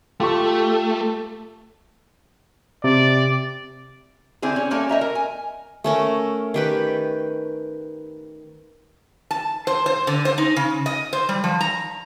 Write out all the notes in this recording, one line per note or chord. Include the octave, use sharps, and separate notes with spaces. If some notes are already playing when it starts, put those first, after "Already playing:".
A3 F4 G4 A4 C#6
C3 D5
D3 C4 E4 G#4
C#4
G3 A#3 C#4 A4 E5
D#5 E5 A#5
A#4
G#5
A3 C#4 A#4
D#3 G4 B4
A5
C5
C5
D3
C5
D#4
C#3
D#5
C5
G3
F3
A#5